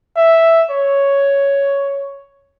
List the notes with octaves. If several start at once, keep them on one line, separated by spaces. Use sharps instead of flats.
E5
C#5